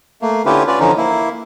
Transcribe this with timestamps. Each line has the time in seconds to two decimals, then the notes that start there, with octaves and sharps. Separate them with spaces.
0.22 A3 A#3
0.46 D3 C#4 E4 F4 G4 B4
0.67 C#4 F4 B4 D5
0.80 D3 E3 F3 C#4 D#4
0.97 A#3 E4